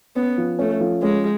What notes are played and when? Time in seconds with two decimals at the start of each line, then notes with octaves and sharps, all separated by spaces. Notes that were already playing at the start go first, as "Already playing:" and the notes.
0.16 B3 C#4
0.38 F3
0.59 A3 C#4
0.80 F3
1.02 G#3 C#4